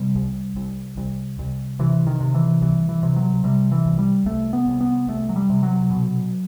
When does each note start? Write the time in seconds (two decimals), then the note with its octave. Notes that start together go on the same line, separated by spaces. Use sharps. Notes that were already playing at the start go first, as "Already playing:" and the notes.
Already playing: C3 G3
0.15 C2
0.56 C2
0.97 C2
1.39 C2
1.79 C3 E3
2.07 D#3
2.21 C3
2.34 E3
2.61 C2 E3
2.89 E3
3.03 C3
3.16 F#3
3.44 C3 G3
3.72 E3
3.85 C2
3.99 G3
4.26 C2 A3
4.53 B3
4.67 C2
4.81 B3
5.08 C2 A3
5.29 F#3
5.36 G3
5.50 C3
5.63 F#3
5.91 B2